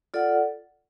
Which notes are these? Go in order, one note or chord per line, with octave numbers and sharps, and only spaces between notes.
F4 A4 D5 F#5